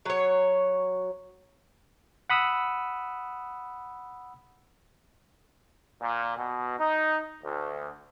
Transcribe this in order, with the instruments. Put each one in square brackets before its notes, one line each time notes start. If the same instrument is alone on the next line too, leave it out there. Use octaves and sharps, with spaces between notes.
[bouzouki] F#3 C#5
[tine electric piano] F#5 B5 D#6 E6
[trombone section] A#2
B2
D#4
D2